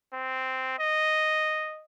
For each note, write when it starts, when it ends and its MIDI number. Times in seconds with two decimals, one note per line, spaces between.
0.14 0.74 60
0.79 1.85 75